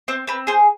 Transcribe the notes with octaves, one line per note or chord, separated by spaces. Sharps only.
C4 C5
C4 B4
G#4 C5